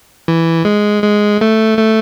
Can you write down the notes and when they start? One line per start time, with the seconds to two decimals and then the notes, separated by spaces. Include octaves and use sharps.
0.28 E3
0.65 G#3
1.03 G#3
1.41 A3
1.78 A3